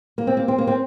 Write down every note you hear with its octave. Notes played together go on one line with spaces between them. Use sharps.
A#3
C4
A#3
C4
A#3
C4